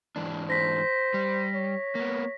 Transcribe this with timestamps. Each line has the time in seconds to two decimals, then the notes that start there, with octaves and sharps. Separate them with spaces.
0.16 G#2 E3 D4
0.50 C5 A#6 B6
1.14 G3
1.55 C#5
1.95 A#3 B3